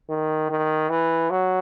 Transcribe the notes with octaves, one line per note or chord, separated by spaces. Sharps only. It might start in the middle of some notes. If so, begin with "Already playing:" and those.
D#3
D#3
E3
F#3